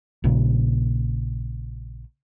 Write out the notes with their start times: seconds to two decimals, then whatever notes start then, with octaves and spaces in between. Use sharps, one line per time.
0.24 A#1 A#2 C#3